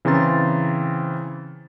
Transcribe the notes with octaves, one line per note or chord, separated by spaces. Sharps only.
C#3 E3 C4 A#5 C6 A6